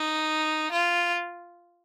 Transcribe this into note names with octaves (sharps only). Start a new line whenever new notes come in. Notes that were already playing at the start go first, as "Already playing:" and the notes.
Already playing: D#4
F4